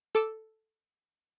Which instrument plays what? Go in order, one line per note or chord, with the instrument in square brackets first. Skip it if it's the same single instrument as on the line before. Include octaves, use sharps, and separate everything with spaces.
[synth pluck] A4 D6 E6